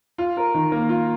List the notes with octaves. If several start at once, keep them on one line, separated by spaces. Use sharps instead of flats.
F4
A#4
D#3
A#3
F4